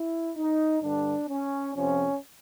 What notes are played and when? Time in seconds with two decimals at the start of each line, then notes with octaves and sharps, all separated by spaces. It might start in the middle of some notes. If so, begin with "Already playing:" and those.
Already playing: E4
0.36 D#4
0.82 G2 D3 G3 D4
1.29 C#4
1.75 F2 C3 F3 C#4